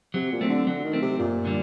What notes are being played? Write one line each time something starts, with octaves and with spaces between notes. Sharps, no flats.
C3 F#3
A#2
A3 C4
D3
D3 F#3
D#3
A3 C4
C3
F#2 A#2
D3 G3